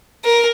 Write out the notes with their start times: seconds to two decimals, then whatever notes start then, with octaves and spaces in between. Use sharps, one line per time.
0.24 A#4